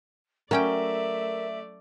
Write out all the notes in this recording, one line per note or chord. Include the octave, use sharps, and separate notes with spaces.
F#3 A3 C#4 A#4 D5 E5 G5